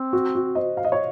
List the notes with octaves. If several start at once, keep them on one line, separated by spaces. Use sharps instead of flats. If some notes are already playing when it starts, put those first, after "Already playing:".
Already playing: C4
F#4
F#4
C5 D#5
F5
D#5
C#5